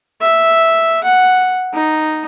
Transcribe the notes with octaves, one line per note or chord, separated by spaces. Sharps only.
E5
F#5
D#4